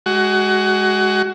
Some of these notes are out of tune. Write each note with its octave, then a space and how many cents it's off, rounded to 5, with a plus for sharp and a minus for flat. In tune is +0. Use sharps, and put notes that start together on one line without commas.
G#3 +5 F#4 +25